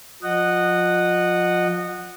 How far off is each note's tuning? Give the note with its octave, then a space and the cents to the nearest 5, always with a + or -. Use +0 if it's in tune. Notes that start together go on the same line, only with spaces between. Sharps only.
F3 +25 D#5 -20 F#5 +0